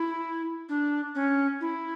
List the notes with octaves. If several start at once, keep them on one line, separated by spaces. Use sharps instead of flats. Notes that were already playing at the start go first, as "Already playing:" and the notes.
Already playing: E4
D4
C#4
E4